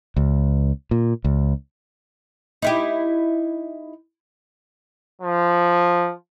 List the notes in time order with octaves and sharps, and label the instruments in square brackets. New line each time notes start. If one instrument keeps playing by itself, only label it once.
[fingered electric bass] C#2
A#2
C#2
[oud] D#4 E4 G4
[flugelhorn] F3